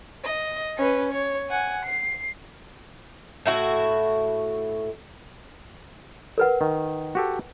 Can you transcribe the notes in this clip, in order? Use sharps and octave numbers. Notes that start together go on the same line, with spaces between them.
D#5
C#4 B4
C#5
F#5 G#5
C7
A2 E4 F#4
A#4 B4 F#5
D#3
F#4 G4 A4